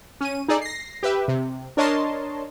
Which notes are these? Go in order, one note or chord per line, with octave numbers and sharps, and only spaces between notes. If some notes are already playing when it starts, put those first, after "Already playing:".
C#4 D#7
D#4 G#4 A4 D5
A#6 C7
G4 B4 E5
C3
D4 A#4 C#5 D#5 A5 C6